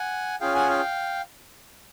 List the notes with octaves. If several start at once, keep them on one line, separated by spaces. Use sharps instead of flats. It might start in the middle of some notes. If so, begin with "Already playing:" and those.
Already playing: F#5 G#5
C#4 F4 G#4 F5 G5
F#5 G#5
F5 G5